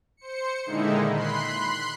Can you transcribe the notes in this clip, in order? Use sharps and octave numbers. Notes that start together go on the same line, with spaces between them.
C5 C#7
A#2 D3 D#3 G#3 D#4 E4
B5 C6 F#6 C7